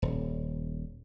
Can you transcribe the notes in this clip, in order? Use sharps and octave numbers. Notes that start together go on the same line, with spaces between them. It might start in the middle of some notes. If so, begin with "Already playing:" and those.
D#1